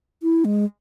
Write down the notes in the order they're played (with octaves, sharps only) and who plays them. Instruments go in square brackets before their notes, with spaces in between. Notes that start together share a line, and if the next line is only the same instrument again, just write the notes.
[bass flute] E4
G#3